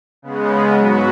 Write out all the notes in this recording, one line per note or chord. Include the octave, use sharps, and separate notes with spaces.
C#3 G#3 B3
G#2 F#3 B3 F#4